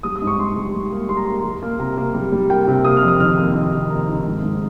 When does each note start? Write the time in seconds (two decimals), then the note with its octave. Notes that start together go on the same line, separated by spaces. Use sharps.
0.03 G3 D#6
0.16 D#6
0.22 G#2
0.27 C#6
0.39 G#2 C6
0.56 G3
0.74 G3
0.92 A#3
1.09 G3 C6
1.17 A#5
1.25 A#3 C6
1.44 G3
1.63 A#3
1.79 C3 A#5
1.97 A#3
2.14 G3
2.32 G3
2.50 A#3 G5
2.68 C3
2.84 A#3 D#6
2.97 F6
3.03 F2
3.08 D#6
3.20 D#3 F6
3.38 A#3
3.55 D#3
3.73 C3
3.90 A#3 A#5
4.08 D#3
4.26 G#2
4.43 G#2